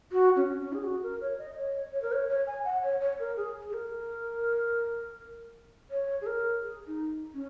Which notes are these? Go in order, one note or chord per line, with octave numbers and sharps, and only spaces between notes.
F#4
C#4
C#4
G#4
F#4
A#4
C#5
D#5
C#5
C#5
A#4
C#5
C#5
G#5
F#5
C#5
C#5
A#4
G#4
G#4
A#4
C#5
G#4
A#4
G#4
D#4
C#4